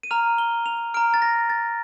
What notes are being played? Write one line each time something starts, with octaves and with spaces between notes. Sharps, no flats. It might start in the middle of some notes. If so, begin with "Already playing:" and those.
D#7
A#5 F6 F7
G7
F7
A#5 F6 D7
A6
A#6
A6